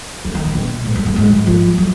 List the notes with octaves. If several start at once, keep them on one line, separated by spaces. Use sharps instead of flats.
F3
D#3
B2
B2
G#2
F#2
F#2
G#2
F3
F3
F#3